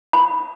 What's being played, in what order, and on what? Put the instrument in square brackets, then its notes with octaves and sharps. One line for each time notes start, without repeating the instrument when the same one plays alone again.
[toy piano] B5